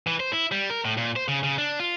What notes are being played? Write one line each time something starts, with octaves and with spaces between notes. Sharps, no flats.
E3
C5
E4
G3
A#4
A2
A#2
C5
C#3
C#3
D4
F4